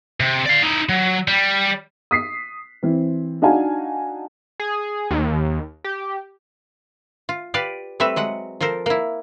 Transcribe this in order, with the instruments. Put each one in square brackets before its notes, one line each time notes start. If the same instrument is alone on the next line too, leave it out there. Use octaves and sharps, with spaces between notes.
[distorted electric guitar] C3
D5 F5
D#4 E4
F#3
G3
[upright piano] D#6 B6 C7
E3 C4
D4 D#4 F#4 F5 G#5 A5
[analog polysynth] G#4
D#2
G4
[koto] F4
G4 B4 D5 F5
G3 A3 C4 B4 E5
F#3 G#3 F#5
F3 A4 A#4 C5
A#3 E4